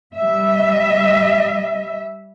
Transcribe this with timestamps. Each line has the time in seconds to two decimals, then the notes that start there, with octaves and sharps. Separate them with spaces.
0.16 G3 E5